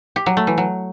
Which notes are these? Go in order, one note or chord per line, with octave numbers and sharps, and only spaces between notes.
G4
F#3
A3
E3
F#3